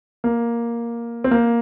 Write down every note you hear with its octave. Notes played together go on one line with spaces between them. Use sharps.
A#3
C4
A#3